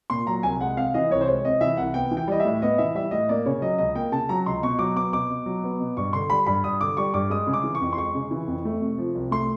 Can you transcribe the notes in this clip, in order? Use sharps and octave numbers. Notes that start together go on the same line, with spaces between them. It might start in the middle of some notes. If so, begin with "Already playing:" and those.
A#2 C6
F#3 A#5
C2 G#5
G#3 F#5
C3 F5
E3 D#5
C2 C#5
C5
G#3 C#5
C3 D#5
E3 E5
C2 F#5
B3 G5
E3
G5
G3 D#5
E5
A2
B3 D#5
E3 E5
G3 E5
A2 D#5
A#3 D5
C#3 C#5
F#3 D#5
C#2 D#5
A#3 G5
C#3 A5
F#3 A#5
C#2 C6
B2 C#6
F#3 D6
B3 D6
B2 D6
B2
F#3
B3
B2
G2 C#6
D3 C6
G3 B5
G2 B5
G2 D#6
D3 D6
G3 C#6
G2 D6
G#3 D#6
C#3
D6
E3
C#6
F2
C6
G#3 C#6
C#3
E3
F2
A3
C3
F3
C2
A3 C6